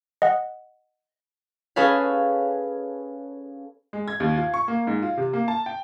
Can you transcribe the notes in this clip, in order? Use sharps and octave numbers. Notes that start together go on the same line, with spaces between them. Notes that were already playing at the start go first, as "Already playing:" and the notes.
D#5 F#5
C#4 G#4 A4 B4 C#5 F5
G#3
G#6
D#2
F4
C#6
A#3
G#2
F4
C3
A#3
A5
G5